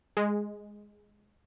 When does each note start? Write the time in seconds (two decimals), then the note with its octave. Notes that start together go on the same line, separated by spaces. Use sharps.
0.17 G#3